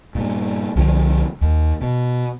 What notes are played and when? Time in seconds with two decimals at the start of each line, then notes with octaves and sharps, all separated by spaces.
0.15 G2 A#2
0.76 C2 D3 D#3 F3
1.41 D#2
1.81 B2